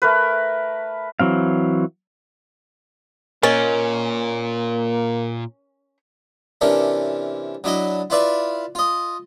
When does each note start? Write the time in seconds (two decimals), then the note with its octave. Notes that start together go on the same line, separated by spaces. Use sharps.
0.02 A3 A#4 B4
1.20 E3 F#3 C4 F5
3.43 A#2 A#3 C#4 A#4 D#5
6.61 C3 E3 C#4 D4 A#4
7.64 F#3 D4 E4 D#5
8.10 E4 F4 B4 D5 E5 F5
8.75 F4 D#5